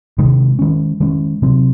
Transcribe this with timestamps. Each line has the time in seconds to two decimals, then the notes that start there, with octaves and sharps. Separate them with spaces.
0.18 C3 D#3 G#3
0.59 D#3 G#3 C#4
1.00 D#3 G#3 C#4
1.42 C3 F#3 C4